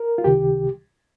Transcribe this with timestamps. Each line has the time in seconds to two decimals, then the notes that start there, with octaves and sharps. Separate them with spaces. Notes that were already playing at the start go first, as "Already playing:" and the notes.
Already playing: A#4
0.18 F4
0.24 C#2 C3 D#3 G4